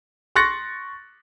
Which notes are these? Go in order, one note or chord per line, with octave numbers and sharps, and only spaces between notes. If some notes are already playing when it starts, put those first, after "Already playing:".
C6 C#6 F#6 A6 A#6 C#7